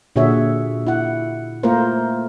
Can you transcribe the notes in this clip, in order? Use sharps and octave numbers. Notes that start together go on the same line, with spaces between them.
A#2 D3 F#4 G#4 C#5 E5
E4 F#5
A3 A#3 F4 A#4 C5